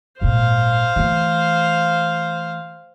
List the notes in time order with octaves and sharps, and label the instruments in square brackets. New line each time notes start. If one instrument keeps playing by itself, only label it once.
[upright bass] G#1 A#2 [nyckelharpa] C5 F5
[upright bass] E3 A3